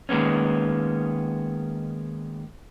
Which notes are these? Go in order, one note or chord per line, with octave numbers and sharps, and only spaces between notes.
D#3 G#3 A#3 B3 C#4